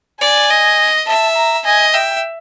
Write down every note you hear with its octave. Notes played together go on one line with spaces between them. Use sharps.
D5 G#5
D#5
E5 A5
A#5
D#5 G#5
E5 G5